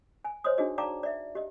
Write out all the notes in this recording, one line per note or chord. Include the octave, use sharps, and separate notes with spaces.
G#5
C5 C#5 D#5 C6 D#6
D4 D#4 F#4 G#4 D#5
D5 F5 G5 A5 A#5 D6
D5 E5
G4 D#5